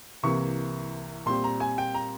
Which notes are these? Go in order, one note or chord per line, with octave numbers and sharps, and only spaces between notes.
C2 C3 E3 A#3 C#6
A#2 G3 C4 C6
A#5
G#5
G5
A#5